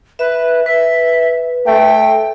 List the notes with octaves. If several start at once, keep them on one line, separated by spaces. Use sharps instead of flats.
B4 E5
B4 E5
A3 G5